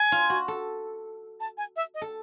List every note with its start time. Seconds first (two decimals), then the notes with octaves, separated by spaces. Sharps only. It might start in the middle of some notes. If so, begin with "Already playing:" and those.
Already playing: G#5
0.12 F4
0.30 F#4
0.48 A4
1.40 A5
1.58 G#5
1.76 E5
1.94 D#5
2.02 A4